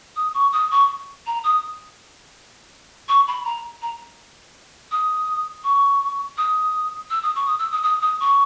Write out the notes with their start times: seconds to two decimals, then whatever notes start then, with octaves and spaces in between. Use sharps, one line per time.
0.16 D#6
0.34 C#6
0.53 D#6
0.71 C#6
1.26 A#5
1.44 D#6
3.08 C#6
3.28 B5
3.45 A#5
3.82 A#5
4.91 D#6
5.64 C#6
6.37 D#6
7.10 E6
7.23 D#6
7.36 C#6
7.47 D#6
7.59 E6
7.72 D#6
7.83 D#6
8.02 D#6
8.20 C#6